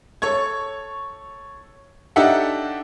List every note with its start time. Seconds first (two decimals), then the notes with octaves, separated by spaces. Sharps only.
0.22 A4 C#5 C#6 G#6
2.16 D4 D#4 G4 A4 E5 F#5